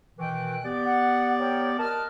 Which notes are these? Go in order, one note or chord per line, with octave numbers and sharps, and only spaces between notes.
B2 D#3 E3 G5 F#6
B3 G4 D5
F#5
A#4 C#5 G5
A#4 D#5 A5 F6 F#6